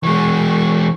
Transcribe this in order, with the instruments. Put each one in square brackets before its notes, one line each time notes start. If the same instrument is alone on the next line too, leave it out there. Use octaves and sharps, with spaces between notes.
[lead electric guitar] E3 G#3 [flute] C#6